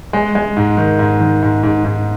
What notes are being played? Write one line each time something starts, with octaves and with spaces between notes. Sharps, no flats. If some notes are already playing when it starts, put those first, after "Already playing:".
G#3
G#3
G#2
D#3
G#2
D#3
G#2
G#2
G#2